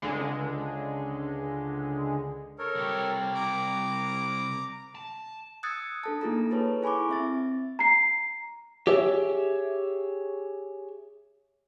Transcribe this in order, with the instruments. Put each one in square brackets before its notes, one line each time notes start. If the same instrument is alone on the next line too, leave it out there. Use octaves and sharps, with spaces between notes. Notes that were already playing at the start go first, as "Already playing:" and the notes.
[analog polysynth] C#2 D3 G#3
[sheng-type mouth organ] A4 A#4 C#5
[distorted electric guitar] C2 G4
[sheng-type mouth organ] A#5 D6
[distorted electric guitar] A5
[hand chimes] D#6 E6 F#6 G#6 A6 C#7
D4 A4 A5
A#3 D#4 F4 G#4 A4 A#5
G#4 A4 B4 C#5 A5
E4 G#5 B5 C#6 D6
C4 E5 A6
[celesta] A#5 C7
[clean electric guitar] G4 G#4 C#5 E5